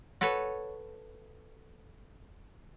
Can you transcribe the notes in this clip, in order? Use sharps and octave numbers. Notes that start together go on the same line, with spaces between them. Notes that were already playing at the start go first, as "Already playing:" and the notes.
F#4 A4 B4 C#5